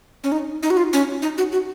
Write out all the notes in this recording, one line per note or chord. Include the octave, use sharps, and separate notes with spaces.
C#4
D#4
D#4
F#4
F4
C#4
D#4
F#4
F#4